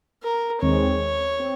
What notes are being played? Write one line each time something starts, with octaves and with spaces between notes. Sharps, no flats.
A#4
D#2 D#3 G#3 C4 C#5
C4